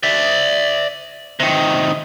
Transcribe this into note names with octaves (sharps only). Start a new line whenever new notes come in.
D5 E5
C3 D#3